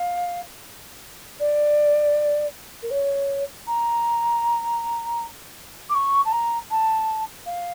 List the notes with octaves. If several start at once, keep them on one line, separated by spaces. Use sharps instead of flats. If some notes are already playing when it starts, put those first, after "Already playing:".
Already playing: F5
D5
A#4
C#5
A#5
D6
C#6
A5
A#5
A5
F5